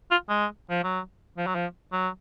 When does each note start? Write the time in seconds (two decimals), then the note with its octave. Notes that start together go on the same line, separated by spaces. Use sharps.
0.11 F4
0.29 G#3
0.70 F3
0.84 F#3
1.37 F3
1.47 F#3
1.55 F3
1.92 F#3